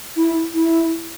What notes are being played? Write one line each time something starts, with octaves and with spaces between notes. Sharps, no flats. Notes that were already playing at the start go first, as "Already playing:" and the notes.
E4
E4